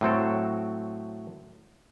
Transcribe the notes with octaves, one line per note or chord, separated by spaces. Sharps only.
A2 F#3 C4 A4